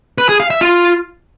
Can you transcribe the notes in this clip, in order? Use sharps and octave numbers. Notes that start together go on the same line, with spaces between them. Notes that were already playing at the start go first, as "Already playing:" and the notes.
B4
G#4
F5
E5
F4